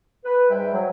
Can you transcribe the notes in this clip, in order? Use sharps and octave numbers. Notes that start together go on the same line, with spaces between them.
B4
G#2 G3 E5 G5
F#3